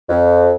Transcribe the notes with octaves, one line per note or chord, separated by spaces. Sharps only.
F2